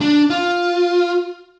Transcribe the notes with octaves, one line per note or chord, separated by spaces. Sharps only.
D4
F4